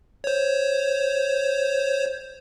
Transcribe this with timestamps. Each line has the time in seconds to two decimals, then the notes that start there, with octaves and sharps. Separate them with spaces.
0.24 C5 C#5